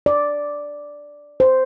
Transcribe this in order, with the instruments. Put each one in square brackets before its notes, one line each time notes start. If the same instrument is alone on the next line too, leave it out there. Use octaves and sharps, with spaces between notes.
[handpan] D5
C5